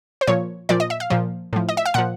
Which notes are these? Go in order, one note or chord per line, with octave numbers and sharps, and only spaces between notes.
C5
A#2 F3 C#5
A#2 F3 D5
D#5
E5
F5
A#2 F3
A2 F3
D#5
E5
F5
A#2 F3 F#5